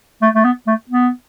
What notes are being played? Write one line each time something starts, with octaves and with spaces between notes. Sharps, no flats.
A3
A3
B3
A3
B3